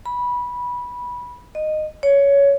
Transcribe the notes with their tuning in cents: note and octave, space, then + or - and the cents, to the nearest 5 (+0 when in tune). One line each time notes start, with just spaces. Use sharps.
B5 -15
D#5 -15
C#5 +15